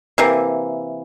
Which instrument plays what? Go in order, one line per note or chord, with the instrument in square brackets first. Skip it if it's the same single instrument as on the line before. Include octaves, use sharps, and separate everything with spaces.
[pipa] C3 E3 A#3